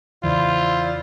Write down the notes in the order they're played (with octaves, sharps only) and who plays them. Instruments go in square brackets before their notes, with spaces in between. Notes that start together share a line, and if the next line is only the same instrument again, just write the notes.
[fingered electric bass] E2 C#3 E3 [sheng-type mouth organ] E4 C5 [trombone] F4 [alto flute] D5